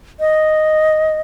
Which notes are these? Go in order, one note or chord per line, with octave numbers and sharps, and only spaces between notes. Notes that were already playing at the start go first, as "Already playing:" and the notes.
D#5